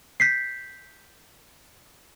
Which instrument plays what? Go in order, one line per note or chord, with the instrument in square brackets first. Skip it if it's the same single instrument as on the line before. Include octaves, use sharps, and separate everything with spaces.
[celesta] G6 B6 C7